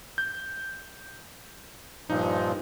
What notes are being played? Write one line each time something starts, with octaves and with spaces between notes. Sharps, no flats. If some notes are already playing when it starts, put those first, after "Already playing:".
G6
G2 A#2 F3 D#4